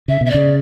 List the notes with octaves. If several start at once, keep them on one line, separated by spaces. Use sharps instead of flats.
C#3 E5
B2 E5
C#3 D5